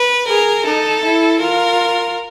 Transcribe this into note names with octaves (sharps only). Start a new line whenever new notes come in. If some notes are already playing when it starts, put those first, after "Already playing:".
Already playing: B4
G#4 A#4
D#4 A4
E4
F4 A#4